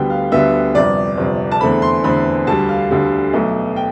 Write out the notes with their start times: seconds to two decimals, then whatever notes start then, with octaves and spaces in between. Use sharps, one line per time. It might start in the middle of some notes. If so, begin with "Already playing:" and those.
Already playing: D2 D3 G3 B3 G5
0.10 F5
0.32 D2 D3 G3 B3 E5
0.75 G1 F2 C3 D5
1.17 G1 F2 C3
1.51 A5
1.61 E2 D3 A3 C4 B5
1.82 C6
2.04 E2 D3 A3 C4 B5
2.47 D2 D3 G3 A5
2.69 F5
2.90 D2 D3 G3
3.33 B1 B2 A3
3.76 G5